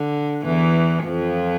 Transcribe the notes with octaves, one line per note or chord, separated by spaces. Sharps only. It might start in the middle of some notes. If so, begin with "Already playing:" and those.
Already playing: D3
E2 E3
F2 F3